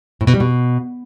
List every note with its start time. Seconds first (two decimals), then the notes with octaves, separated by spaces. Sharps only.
0.21 A2
0.27 B2
0.34 G3
0.40 B2